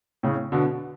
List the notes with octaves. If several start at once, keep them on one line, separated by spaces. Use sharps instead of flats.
A2 C#3
B2 D3